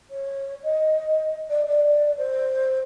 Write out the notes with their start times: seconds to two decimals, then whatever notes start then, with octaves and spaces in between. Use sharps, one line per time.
0.11 C#5
0.63 D#5
1.50 D5
1.67 D5
2.18 C5